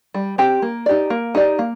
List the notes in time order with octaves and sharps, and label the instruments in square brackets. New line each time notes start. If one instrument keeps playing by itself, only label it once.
[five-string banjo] G3
C4 G4
A#3
D#4 G4 D5
A#3
D#4 G4 D5
A#3